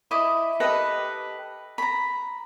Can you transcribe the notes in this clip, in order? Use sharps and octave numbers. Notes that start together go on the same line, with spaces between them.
E4 D#5 B5 D6
G4 A4 B4 D#5
A#5 B5